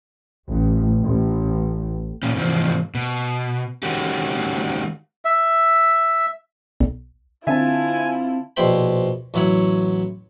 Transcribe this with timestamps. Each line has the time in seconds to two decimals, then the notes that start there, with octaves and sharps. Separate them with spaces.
0.48 A1
1.04 A1
2.23 A#2 C#4
2.36 G#2 C3 E3 F3
2.95 B2
3.83 D#3 G#3 C#4 F#4 G4
5.25 E5
6.80 B1
7.47 D3 C4 E4 F4 E5 G#5 A5
8.57 A#1 B2 E4 C5 G5 B5
9.34 A1 F#3 E4 C#5 F#5